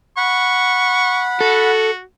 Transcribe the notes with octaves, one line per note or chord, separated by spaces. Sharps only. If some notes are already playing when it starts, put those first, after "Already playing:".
F#5 B5 C#6
F#4 A4